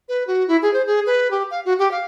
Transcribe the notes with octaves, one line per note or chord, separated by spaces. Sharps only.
B4
F#4
E4
G#4
C5
G#4
B4
G4
F5
F#4
G4
F5